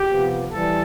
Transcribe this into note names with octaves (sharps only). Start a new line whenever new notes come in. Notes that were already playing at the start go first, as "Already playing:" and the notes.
Already playing: G4
C3 F3 B3
E3 G3 A4